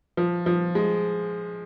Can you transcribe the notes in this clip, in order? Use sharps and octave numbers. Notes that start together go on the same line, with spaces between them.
F3
F3
G#3